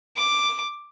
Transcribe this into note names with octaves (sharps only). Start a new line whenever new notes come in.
D6